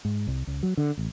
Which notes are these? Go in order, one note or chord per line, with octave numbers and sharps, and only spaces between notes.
G#2
C2
C#2
F#3
D3
A1